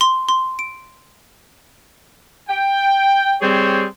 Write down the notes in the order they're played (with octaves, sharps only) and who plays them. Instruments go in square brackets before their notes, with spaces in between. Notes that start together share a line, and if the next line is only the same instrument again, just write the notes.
[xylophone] C6
C6
D7
[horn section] G5
G3 C4 G#4 C5 C#5